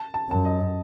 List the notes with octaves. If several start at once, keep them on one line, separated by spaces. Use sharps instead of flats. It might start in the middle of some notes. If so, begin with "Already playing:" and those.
Already playing: A5
A5
F#2 A5
D#5